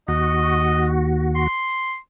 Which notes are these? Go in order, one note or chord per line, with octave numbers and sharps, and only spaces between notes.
D#2 F#4 D#5
C6